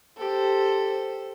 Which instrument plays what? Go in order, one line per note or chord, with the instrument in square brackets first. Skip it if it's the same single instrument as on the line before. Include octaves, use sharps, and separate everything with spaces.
[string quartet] G4 A4 C5